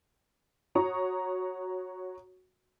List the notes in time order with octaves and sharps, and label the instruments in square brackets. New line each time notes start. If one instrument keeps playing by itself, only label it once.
[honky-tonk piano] F#4 C#5 A#5 C#6 D#6